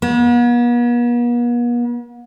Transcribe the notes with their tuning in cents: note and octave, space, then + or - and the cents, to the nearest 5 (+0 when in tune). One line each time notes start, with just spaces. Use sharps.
B3 -45